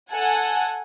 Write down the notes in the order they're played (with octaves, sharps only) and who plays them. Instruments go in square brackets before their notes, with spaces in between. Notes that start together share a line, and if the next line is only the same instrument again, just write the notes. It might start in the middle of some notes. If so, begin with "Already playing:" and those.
[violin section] A4 F#5 G#5